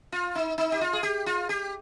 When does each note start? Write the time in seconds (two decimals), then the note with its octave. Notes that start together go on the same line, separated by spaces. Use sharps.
0.12 F4
0.35 D#4
0.58 D#4
0.72 G4
0.81 F4
0.93 G#4
1.03 G4
1.26 F4
1.49 G4